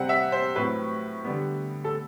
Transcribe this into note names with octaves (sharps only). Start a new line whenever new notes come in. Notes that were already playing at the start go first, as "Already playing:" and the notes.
Already playing: C3 G3 C4 F#5
E5
C5
A2 F#3 C4 B4
D3 G3 B3
A4